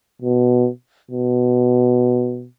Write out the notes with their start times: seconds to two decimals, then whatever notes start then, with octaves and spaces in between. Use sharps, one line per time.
0.22 B2
1.11 B2